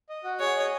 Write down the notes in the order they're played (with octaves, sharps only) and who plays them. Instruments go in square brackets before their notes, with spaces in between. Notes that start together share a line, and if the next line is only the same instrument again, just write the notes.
[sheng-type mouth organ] D#5
F#4
[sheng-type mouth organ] G#4 [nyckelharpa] C#5
[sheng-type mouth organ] D#5